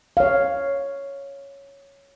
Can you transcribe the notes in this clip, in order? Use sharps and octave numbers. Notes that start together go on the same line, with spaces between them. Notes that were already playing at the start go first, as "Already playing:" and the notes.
C#5 F5